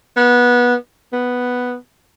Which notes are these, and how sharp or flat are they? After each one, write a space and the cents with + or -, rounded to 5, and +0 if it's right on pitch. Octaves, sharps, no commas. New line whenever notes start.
B3 -20
B3 +0